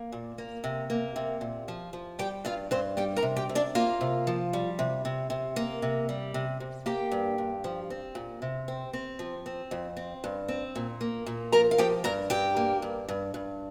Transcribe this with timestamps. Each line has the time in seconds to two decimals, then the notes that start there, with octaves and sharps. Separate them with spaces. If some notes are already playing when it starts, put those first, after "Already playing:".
Already playing: A#3
0.12 A#2
0.38 A#3
0.64 C3
0.90 A#3
1.16 C3
1.41 A#2
1.68 F3
1.93 F3
2.19 G3 G4 G5
2.45 G2 F4 F5
2.71 G2 C4 C5
2.97 G3 G4 G5
3.17 A#4 A#5
3.22 C3
3.36 G4 G5
3.49 C3
3.55 D4 D5
3.75 A#3 F4 F5
4.01 C3
4.27 F3
4.53 G3
4.79 C3
5.05 C3
5.30 C3
5.56 A#3
5.82 C3
6.09 G3
6.34 C3
6.60 C3
6.86 A#3 G4 G5
7.12 G2
7.38 G2
7.64 F3
7.90 C4
8.15 A#2
8.42 C3
8.68 C4
8.93 C4
9.19 F3
9.46 C4
9.71 F2
9.97 C4
10.24 G2
10.48 C4
10.76 A#2
11.01 A#3
11.26 A#2
11.52 F3 A#4 A#5
11.71 F5
11.78 F3 G4 G5
12.04 G2 A#4 A#5
12.30 G2 G4 G5
12.57 A#3
12.82 G2
13.09 G2
13.34 G2